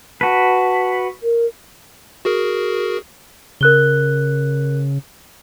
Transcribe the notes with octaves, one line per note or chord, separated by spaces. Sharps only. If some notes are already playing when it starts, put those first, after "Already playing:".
F#4 B4 A5
A#4
F#4 G#4 A#4
C#3 A#4 F#6 G7